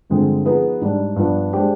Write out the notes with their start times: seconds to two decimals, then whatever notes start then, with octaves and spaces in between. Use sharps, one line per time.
0.10 G2 D3 F3 G#3 C4
0.45 F3 B3 D#4 G#4 B4
0.81 G#2 G3 D4
1.16 G2 F3 B3 D4
1.53 G#3 D4 G4 C5